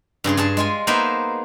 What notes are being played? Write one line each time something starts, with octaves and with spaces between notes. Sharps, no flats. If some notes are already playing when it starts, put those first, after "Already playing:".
G2 C#3 G#4 C6
G2 G#4 A5
G#3 F4 G#5
A#3 B3 D#4 G#4 C5 E5